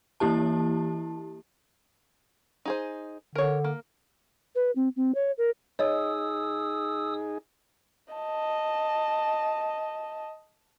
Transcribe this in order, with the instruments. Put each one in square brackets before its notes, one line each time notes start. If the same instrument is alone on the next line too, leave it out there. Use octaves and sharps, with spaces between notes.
[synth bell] E3 A#3 E4 G4 A5
[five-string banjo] D#4 G#4 C5
[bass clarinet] D3 [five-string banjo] A#4 C#5
[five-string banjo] A#3
[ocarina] B4
C4
C4
C#5
A#4
[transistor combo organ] D#4 G#4 [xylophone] C#5 D#5 [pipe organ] D#6 E6
[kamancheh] D#5 A5